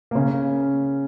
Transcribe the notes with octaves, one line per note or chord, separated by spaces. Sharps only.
A#3
C#3 C#4